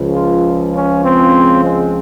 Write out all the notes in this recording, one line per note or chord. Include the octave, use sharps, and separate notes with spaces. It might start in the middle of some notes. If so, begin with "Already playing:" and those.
Already playing: C#2 C#3 F3
F4
C#4
C4
G#3